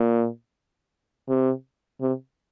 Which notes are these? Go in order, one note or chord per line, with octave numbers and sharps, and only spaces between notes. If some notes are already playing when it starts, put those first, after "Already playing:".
Already playing: A#2
C3
C3